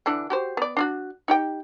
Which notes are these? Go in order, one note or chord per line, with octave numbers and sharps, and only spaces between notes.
D3 E3 D4
F#4 G4 C5
B3 D5
D4 F4 F#4
D#4 G4 G5